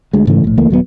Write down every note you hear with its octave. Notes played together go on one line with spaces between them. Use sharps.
D2 G#3
G#2 C#3 E3 A3
A#1 A2
C#2 E3 A3 A#3
D#1 F#3 G3 B3